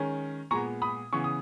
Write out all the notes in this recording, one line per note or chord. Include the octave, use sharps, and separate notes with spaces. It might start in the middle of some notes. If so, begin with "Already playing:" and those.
Already playing: D#3 G#3 C#4
A#2 G#3 B3 A#5 C#6
B5 D#6
C#3 E3 B3 C#6
D#6